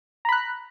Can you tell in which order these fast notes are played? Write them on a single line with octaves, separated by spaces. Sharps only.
A#5 B5 F#6